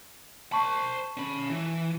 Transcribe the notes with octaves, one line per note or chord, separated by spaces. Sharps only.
C5 A5 B5 C#6
C#4 B5
E3